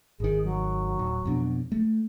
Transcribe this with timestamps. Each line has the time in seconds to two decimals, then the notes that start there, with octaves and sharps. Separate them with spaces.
0.20 G#1 D#3 G#4
0.44 F#3
0.99 D1
1.25 F2 B2 D4
1.72 A3